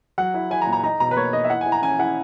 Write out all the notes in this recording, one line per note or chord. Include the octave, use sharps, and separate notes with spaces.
F#3 F#5
E4
E4 G#5
A#5
A#2
A#5
D#4 A#5
B2 A#5
B4
A#3 C#5
D#4 D#5
E5
E4 F#5
G#5
E4
A#5
C#4 G#5
E4 F#5